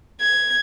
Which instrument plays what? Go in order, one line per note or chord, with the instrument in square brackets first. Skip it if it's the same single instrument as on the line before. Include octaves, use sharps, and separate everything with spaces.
[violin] G#6